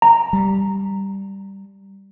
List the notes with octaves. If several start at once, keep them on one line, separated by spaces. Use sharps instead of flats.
A#5
G3